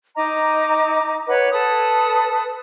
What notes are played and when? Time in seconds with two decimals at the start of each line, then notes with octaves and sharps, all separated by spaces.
0.16 D#4 D#5 A#5 D6
1.28 B4 C#5 F#5
1.52 A4 B4 A5 D#6